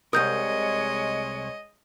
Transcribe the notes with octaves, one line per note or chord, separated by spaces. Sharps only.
C2 G#3 A#4 C#5 D#5 D#6 G6